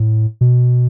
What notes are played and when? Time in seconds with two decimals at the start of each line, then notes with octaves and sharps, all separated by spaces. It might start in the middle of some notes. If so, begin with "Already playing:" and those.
Already playing: A2
0.41 B2